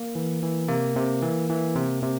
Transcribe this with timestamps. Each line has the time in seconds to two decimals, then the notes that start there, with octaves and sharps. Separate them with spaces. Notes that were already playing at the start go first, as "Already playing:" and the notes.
Already playing: A#3
0.15 E3
0.43 E3
0.68 C3 A#3
0.96 C3
1.22 E3
1.50 E3
1.75 C3
2.02 C3